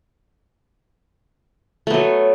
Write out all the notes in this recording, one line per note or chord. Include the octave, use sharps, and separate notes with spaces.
F#3 A3 B3